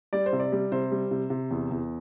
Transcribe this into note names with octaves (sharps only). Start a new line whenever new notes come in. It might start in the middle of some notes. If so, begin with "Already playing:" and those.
G3 D5
C5
C3
D5
G3
C3 C5
G3
C3
C3
E2
E2